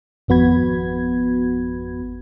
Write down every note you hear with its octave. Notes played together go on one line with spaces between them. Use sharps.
G#1 F2 B3 F#4 B5 G#6